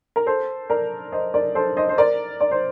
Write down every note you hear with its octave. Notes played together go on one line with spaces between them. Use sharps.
A#4
A4 C5
A#4 D5
C5 D#5
A#4 D5
A4 C5
C5 D#5
C5
A#4 D5
D5
C5